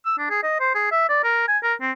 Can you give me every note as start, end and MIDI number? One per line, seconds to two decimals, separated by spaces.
0.05 0.13 88
0.18 0.29 62
0.30 0.41 68
0.43 0.57 75
0.60 0.70 72
0.75 0.87 68
0.91 1.06 76
1.09 1.21 74
1.23 1.47 70
1.48 1.58 80
1.63 1.74 70
1.80 1.91 60